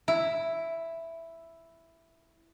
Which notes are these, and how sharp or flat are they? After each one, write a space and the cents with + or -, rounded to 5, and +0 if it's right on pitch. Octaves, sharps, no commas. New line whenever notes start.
E4 +5